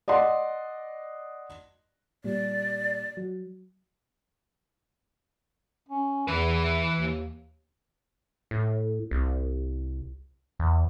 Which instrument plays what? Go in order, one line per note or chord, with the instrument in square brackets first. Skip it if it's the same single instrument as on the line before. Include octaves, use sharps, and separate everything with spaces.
[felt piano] D5 D#5 F#5 C6
[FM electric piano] A#2 G3 [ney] D5
[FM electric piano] F#3
[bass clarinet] C#4
[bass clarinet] E2 [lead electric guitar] E3 B4
[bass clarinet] D#2
[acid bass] A2
C2
E2